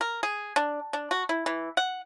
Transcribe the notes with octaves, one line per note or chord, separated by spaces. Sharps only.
A#4
G#4
D4
D4
F#4
E4
E3
F#5